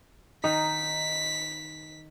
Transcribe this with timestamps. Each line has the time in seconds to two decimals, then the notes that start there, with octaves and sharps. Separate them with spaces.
0.44 D#3 D#4 B6